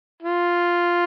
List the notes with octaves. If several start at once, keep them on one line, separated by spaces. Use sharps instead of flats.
F4